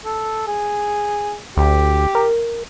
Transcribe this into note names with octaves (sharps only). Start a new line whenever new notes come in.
A4
G#4
D2 G4
A#4